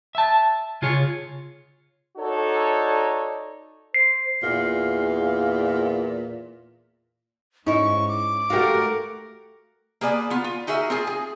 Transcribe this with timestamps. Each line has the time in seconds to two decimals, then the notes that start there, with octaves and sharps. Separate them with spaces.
0.15 E5 A5
0.82 C#3 F4 G#4 C#5
2.18 D4 D#4 F#4 A4 C#5
3.94 C5 C7
4.43 E2 A#2 F5
7.67 G#2 C#4 D#4 E4 C#6
8.08 D6
8.50 A3 F#4 G4 A#4 F5 F#5
10.01 A#3 G#4 B4 D5 G#5
10.30 B3 F4
10.44 F4
10.67 D#4 F#4 G#4 A#4 E5
10.90 C4 F4 G#4
11.07 G#4